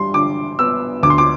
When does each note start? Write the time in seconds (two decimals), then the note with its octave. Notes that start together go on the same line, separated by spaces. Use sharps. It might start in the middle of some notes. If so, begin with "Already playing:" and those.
Already playing: G2 G3 C6
0.14 D3 D6
0.59 B3 E6
1.03 D2 D6
1.10 C6
1.18 D6